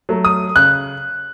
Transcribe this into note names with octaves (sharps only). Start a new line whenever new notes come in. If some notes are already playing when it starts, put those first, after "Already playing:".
F#3 A3
D#6
C#3 F#6